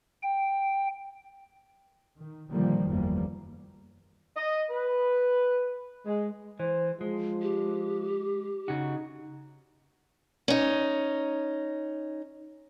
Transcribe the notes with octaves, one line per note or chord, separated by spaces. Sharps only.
G5
D#3
A#2 D3 D#3 F3 G3 A#3
F#1 E2 F3 G3 A#3
D#5
B4
G#3
E3 C5
F3 G#3
G4
C#3 D#4 F#4
C#4 D#4